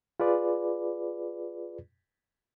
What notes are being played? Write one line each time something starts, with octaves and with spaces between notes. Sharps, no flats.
F4 G#4 B4 D5